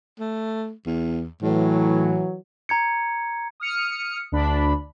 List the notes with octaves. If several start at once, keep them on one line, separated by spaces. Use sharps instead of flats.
A3
E2
A2 E3 F#3
A#5 G#6 C#7
D#6 F6 C#7
D2 D4 B5